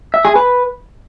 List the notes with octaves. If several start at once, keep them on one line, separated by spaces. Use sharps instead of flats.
E5
G#4
B4